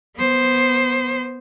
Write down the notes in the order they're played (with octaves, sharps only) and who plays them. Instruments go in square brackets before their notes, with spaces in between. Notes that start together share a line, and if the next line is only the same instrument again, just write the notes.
[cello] B3 C5